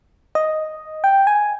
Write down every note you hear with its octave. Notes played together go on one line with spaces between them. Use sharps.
D#5
G5
G#5